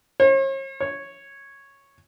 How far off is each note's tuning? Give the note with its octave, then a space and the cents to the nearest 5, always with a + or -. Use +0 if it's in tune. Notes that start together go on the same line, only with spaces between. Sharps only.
C#5 -45
C#5 -5